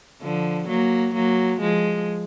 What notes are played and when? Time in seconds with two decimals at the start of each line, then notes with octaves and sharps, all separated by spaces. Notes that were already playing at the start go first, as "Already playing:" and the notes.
0.22 D3 F3
0.68 F#3 A#3
1.15 F#3 A#3
1.60 F3 G#3